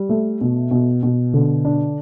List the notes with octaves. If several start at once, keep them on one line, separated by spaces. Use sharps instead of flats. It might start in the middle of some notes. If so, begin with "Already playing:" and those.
Already playing: G3
A3
B2
B2
B2
D3
D4